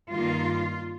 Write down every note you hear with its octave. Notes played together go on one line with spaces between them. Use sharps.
G2 D#3 A#3 F4